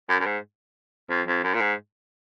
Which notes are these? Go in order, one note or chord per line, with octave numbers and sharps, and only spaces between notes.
F#2
F#2
G#2
F2
F2
F#2
A#2
G#2